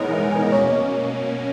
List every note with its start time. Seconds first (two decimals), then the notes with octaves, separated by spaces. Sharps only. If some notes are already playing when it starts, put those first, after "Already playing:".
Already playing: E3 G#3 B3 D#4 A#4 C#5 D#5
0.12 E5
0.32 G#5
0.43 D#5
0.52 B2 A#3 C#4 C#5
0.72 D#5